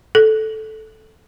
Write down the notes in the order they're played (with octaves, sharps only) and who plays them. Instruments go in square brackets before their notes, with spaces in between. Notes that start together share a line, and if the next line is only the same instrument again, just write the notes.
[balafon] A4